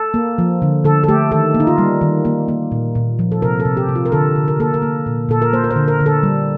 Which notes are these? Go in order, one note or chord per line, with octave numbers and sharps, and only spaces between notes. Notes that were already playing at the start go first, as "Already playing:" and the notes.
Already playing: A4
A#3
F3
D3
D3 A4
A4
A3 G4
D#3 A4
A#3
D#4
F4
G3
D#3
A#3
A#3
A#2
A#2
F3
A4
C3 A#4
A4
C3
G4
C3
F4
A#4
D3 A4
D3
A#4
A#3 A4
A#4
A#3
A#2
A#2 A4
A#4
A#3 C5
A#4
C5
D3
A#4
D3
A4
G3